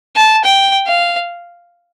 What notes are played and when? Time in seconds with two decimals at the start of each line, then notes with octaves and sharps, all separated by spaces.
0.16 A5
0.44 G5
0.87 F5